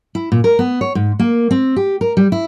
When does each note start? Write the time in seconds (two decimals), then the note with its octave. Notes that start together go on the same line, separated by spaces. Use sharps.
0.15 E4
0.32 A#2
0.44 A#4
0.59 B3
0.81 C#5
0.95 G#2
1.19 A#3
1.51 C4
1.76 G4
2.01 A#4
2.17 G3
2.32 E4